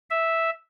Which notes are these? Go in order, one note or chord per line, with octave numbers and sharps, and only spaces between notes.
E5